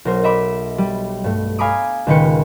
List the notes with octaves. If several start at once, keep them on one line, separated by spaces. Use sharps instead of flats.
B1 A#4 C5
D#5 E5 B5 D6
G3
G2 A3
F5 G#5 A#5 B5 D6 D#6
C#2 A#2 D#3 B4 G5 C#7